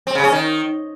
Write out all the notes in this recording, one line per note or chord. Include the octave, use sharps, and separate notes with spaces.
C4
C#3
C#4
D#3